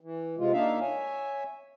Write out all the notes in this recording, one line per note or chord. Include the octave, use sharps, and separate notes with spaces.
E3
C3 G#3 F4
A#3 D4 D#4 E5 F5
C#5 E5 G#5